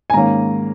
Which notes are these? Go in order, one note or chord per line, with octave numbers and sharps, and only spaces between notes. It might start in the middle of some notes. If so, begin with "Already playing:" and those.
G#5
G#2 D#3 A#3 C#4 A#5